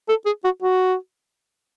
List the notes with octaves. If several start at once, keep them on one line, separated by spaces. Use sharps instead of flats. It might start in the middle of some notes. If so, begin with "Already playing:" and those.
A4
G#4
F#4
F#4